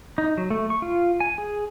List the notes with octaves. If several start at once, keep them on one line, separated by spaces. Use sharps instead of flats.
D#4
F#3
A3
C#6
F4
G#5
G#4